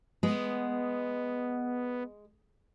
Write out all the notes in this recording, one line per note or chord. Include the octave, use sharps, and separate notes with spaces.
G#3 B3